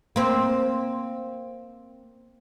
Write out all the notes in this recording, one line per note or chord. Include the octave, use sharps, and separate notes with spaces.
A#3 C4